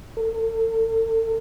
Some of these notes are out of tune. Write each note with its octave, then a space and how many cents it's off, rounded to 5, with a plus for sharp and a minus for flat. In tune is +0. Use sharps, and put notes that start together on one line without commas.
A4 +40